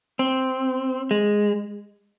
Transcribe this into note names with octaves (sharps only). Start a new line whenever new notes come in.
C4
G#3